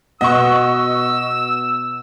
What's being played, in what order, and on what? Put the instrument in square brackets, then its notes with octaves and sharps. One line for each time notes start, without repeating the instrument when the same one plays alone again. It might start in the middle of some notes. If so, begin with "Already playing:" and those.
[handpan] B2 B3 F#5 [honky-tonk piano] D#5 C#6 [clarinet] E6